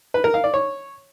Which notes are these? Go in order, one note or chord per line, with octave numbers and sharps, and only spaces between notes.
B4
A#4
F5
D5
C#5